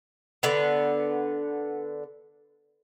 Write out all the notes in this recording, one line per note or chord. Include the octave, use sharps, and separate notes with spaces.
D3 B3